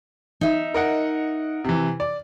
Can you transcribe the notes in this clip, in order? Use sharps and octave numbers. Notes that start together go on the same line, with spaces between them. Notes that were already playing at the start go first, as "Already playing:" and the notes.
D#4 E5
A#4 D#5 F#5
C3 E3
D5